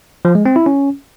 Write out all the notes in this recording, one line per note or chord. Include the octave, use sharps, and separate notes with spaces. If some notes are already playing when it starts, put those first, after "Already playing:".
F3
G#3
C4
E4
C#4